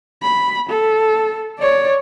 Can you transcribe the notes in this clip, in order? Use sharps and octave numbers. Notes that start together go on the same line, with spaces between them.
B5
A4
C#5 D5